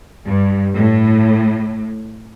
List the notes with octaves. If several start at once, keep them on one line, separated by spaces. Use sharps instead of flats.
G2
A2